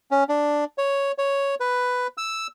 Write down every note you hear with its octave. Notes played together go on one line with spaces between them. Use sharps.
C#4
D4
C#5
C#5
B4
E6